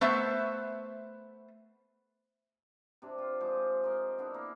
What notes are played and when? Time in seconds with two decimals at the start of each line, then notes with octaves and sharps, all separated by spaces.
0.01 A3 B3 C5 E5
3.02 C3 D4
3.18 F4
3.40 F3 G#3 C5 D6
3.84 A#4 D#5 C6
4.18 B3 D4 E4 G#4
4.34 A#3